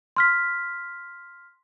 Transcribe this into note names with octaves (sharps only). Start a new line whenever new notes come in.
C6 F6 B6